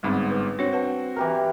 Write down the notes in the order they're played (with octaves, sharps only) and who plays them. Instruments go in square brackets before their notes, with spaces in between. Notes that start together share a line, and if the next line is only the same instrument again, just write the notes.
[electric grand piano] G1 G#2 B3 [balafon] G3 C4
[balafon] B4
[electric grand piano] C4 F#4 [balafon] D4 C#5
[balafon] B4 F#5 A5
[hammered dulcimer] E3 G4 A#4